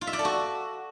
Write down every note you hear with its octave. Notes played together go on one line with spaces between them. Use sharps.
F4
E5
D5
A4
F#4